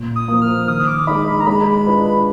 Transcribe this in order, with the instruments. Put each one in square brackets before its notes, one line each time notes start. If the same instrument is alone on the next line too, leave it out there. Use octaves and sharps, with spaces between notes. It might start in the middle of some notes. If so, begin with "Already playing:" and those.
Already playing: [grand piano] A#2
[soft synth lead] D#6
[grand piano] F3 A#3
[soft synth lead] F6
[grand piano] D#3 [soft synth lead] D#6
[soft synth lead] D6
[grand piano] G#3 D#4 [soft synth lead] B5
[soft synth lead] B5
A#5
[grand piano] G#3 [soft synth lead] B5
[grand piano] D4 F4 B4 D#5